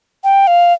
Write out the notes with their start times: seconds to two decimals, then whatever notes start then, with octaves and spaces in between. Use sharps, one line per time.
0.24 G5
0.47 F5